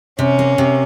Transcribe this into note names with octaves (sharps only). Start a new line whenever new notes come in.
C3 C#4
A#3
C3